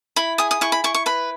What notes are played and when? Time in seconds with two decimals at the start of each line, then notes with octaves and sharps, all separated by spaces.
0.16 E4 B5
0.38 G#4 D#6
0.51 D#6
0.61 E4 C#6
0.72 B5
0.84 E4 C#6
0.94 C#6
1.06 B4 B5